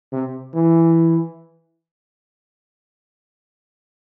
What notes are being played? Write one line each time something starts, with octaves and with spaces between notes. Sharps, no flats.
C3
E3